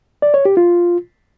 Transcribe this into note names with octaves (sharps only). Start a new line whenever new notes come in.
D5
C#5
G4
F4